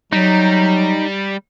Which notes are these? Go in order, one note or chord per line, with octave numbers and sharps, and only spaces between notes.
F#3 G3 D#4